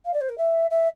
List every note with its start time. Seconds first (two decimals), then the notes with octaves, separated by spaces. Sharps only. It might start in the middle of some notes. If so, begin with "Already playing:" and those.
0.05 F5
0.13 D5
0.21 C5
0.29 A#4
0.38 E5
0.70 E5